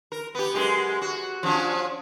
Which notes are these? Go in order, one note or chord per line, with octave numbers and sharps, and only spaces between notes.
A#4
B3 G4
F#2 G#3 G4
F#4
F3 C#4 D4